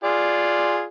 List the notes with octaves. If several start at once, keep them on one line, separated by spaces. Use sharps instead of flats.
F4 G#4 D5